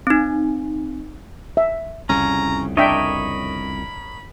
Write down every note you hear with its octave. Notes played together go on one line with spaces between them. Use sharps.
C4 D#4
E5
C2 F2 C#3 C#4 A#5
D4 A#4 C#5 D#5 E5 G5 B5